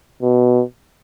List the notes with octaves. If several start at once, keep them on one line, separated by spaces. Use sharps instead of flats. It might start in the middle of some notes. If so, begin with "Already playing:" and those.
B2